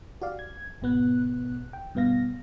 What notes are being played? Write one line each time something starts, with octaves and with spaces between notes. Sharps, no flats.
F#4 G4 D5 F5
G#6
G#1 B2 B3 F#6
G5
G2 B2 B3 F5 A#6